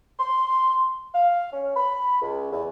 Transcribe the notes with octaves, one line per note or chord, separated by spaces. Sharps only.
C6
F5
C#4
B5
C#2
E2